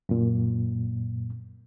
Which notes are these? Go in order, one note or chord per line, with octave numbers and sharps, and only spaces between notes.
F#2 A#2